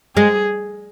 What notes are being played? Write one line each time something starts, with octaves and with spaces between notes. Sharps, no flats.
G#3 G#4